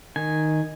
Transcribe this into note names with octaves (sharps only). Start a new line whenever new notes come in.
D#3 G#5